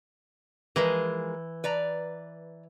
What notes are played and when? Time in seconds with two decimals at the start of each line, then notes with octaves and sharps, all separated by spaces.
0.76 E3 F3 G#3 A#4
1.64 B4 D5 A#5